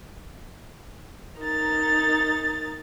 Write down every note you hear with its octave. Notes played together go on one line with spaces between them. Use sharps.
D#4 A#4 A6